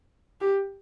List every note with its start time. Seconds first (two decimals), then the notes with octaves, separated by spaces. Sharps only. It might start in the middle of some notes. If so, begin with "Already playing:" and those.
0.41 G4